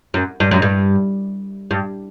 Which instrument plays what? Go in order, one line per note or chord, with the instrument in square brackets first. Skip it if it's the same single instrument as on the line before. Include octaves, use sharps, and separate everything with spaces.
[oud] F#2
G2
F#2
G2
G2